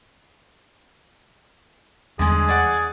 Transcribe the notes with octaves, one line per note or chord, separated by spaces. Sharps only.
E2 D3 G3 G#3 B3 G#4
D5 F#5